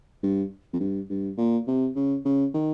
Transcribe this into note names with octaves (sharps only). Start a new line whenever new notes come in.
G2
F2
G2
G2
A#2
C3
C#3
C#3
D#3